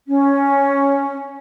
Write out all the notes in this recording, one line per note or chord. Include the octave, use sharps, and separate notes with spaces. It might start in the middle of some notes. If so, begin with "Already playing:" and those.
C#4